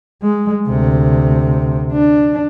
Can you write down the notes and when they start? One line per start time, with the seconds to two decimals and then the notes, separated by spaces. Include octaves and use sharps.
0.22 G#3
0.68 D2 C3
1.92 D4